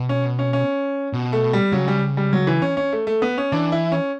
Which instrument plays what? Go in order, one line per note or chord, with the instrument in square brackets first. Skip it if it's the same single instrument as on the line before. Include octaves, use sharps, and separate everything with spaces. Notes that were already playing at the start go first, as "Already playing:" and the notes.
Already playing: [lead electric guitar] B2
[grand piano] C#4
C#4
C#4
[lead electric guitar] B2
[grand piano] A3
G3
[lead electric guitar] C#3 [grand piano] F#3
[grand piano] G3
G3
F#3
E3
C#4
C#4
A3
A3
B3
C#4
[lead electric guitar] E3 [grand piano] D4
[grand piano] E4
C#4